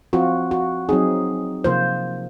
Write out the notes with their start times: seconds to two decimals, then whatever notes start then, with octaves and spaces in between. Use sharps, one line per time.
0.13 F3 C4 F4 F#4
0.51 F#4
0.89 F#3 C4 D#4 G#4
1.64 C3 F3 A#3 F4 C5